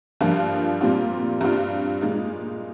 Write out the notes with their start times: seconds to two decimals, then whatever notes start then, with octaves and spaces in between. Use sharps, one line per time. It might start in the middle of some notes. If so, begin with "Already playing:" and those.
0.21 G2 F3 A#3 F4
0.81 A#2 G3 C4 F4
1.41 G2 G3 C4 F4
2.01 A#2 G#3 D#4